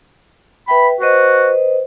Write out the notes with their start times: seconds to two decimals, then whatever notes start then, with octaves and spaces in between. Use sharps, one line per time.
0.68 B4 E5 G5 B5
1.00 F#4 B4 C5 D#5